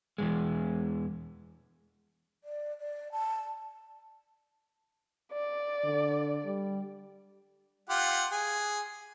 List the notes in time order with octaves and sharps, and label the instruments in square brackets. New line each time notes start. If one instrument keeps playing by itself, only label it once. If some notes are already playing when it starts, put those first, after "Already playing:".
[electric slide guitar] E2 G#2 G#3
[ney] D5
D5
A5
[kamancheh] D5
[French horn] D3
G3
[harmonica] F4 G4 F#5
G#4